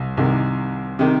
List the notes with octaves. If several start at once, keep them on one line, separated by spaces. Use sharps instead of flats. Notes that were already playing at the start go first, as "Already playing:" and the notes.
Already playing: C2
C2 C3 D#3
C3 D#3